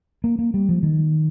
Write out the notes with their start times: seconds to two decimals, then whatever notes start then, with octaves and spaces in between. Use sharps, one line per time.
0.24 A#3
0.39 A#3
0.54 G3
0.69 F3
0.83 D#3